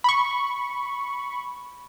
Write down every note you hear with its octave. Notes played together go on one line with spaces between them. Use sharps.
B5 C#6